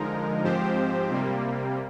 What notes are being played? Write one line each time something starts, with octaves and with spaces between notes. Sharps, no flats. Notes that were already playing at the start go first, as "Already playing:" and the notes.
Already playing: D3 F3 G#3 D#4 A#4
G#2 F3 C4 G4 C5
C3 G3 A#3